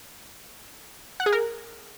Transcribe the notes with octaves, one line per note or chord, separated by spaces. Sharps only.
F#5
G#4
A#4